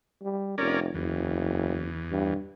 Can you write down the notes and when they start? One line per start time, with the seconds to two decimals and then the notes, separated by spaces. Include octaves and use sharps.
0.22 G3
0.58 F1 C#4 A#4 D5
0.94 F#1 E2
2.11 G2